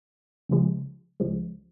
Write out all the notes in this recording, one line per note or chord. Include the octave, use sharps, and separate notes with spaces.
C#2 C#3 F3 G#3
C#2 C#3 F3 G#3